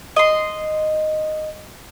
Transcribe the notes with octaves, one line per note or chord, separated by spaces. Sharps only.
D#5 C6